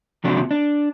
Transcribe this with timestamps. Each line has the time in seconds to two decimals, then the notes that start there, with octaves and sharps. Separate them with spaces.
0.24 D#2 C3 F3 F#3 D4
0.51 D4